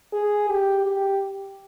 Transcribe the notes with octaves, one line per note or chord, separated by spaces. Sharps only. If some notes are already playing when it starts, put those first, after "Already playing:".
G#4
G4
G4